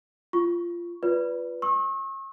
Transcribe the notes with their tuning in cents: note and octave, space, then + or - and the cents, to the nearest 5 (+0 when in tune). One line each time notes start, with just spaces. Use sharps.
F4 -15 C#6 +0
F4 +0 B4 +0 D5 -20
C#6 -40 E6 -35